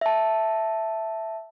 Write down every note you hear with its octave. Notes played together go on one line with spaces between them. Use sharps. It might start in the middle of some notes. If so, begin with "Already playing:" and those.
E5 A5